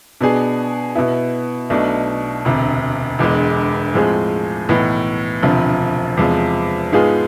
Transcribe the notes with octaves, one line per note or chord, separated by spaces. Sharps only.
B2 B3 D4 G#4
B2 B3 E4
B1 B2 A3 D4
E1 D2 C3
E1 E2 D3 G#3
A2 F3 G#3 C4 G#4
B1 A2 E3 B3
E1 D2 C3 F3
E2 C3 F3 G#3
G#2 G#3 B3 F4 G#4